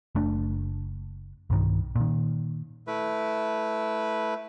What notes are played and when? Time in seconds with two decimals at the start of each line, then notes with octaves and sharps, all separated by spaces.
0.15 F#1 A3 D4
1.50 B1 G2 D#3
1.96 A#2 D#3
2.87 A3 E4 B4